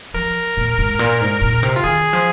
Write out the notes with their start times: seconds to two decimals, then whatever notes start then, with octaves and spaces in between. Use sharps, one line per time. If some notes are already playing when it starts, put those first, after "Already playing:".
0.14 F3 A#4
0.57 A#2
0.78 G#2
0.99 A#2
1.21 G#2
1.42 A#2
1.63 C3
1.76 F4
1.84 D#3 G#4
2.13 F3